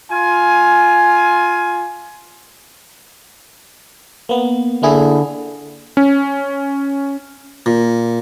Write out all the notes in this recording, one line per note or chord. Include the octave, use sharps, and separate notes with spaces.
F4 G#5
A#3 B3
D3 A#3 E4 G#4
C#4
A#2